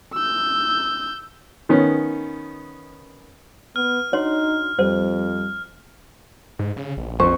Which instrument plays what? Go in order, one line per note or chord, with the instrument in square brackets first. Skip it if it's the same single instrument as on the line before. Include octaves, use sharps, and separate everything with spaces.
[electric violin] E6 G6
[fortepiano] D#3 B3 C#4
[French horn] B3 [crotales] F6
[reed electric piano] D4 F#4 C6 [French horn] D#4 [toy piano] C#5
[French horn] F2 [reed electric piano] G3 [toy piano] C5
[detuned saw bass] G#2
C#3
A#1
[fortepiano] F2 [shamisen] C5 [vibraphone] C#6